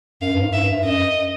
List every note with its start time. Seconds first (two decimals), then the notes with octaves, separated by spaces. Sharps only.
0.21 F#2 F5
0.33 G2
0.43 G#2
0.53 E5
0.63 G2
0.84 F#2 D#5